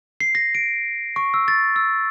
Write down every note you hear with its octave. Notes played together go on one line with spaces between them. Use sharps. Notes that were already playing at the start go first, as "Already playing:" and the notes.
C7
A#6
D7
C#6
E6
A6
E6